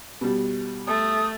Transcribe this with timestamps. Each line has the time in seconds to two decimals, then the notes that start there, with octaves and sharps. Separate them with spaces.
0.21 B2 G3
0.87 A3 D#6